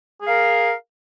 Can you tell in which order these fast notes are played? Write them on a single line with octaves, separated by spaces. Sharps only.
G#4 F5 A#4